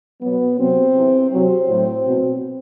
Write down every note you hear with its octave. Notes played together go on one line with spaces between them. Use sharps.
B2 F#3 B3
C3 F#3 C4
C3 E3
C3 F#3 C4
A2 F#3
B2 F#3